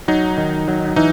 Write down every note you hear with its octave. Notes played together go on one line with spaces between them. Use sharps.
F#3 D#4
D#3
F#3
E3 D#4